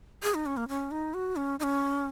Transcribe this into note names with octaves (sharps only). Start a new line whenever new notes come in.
G#4
D#4
C#4
A#3
C#4
D#4
F#4
C#4
D#4
C#4